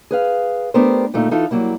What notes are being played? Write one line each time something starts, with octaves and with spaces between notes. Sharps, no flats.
G#4 B4 F5
A3 B3 D4 G4 A#4 C5
D2 A#2 A3 D#4
E3 D#4 F4 A4
F#3 G3 A#3 E4